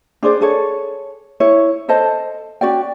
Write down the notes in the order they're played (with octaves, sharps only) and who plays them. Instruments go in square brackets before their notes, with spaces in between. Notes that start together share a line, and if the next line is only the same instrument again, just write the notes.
[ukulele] D4 G#4 C5 D5
G#4 A4 C#5
E4 C#5
A4 C5 D#5 A5
C#4 F#4 D5 G5